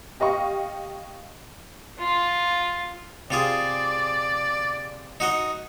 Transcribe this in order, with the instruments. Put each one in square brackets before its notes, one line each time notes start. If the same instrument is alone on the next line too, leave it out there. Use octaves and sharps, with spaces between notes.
[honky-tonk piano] G4 D#5 F5 C#6
[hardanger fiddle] F4
[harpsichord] C3 F4 G#4 [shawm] D5
[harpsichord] D#4 F#4 D#5